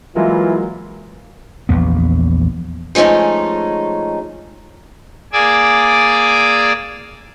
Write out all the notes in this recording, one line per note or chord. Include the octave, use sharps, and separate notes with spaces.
E3 F#3 G#3 A#3 E4 F4
A#1 E2 B3
F3 G#3 A3 C#4 D#4
A#3 G#4 D5 G#5 D6 E6